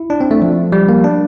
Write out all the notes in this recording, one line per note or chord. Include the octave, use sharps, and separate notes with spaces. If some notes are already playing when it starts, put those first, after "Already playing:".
Already playing: E4
D4
C4
A3
F3
G3
A#3
D4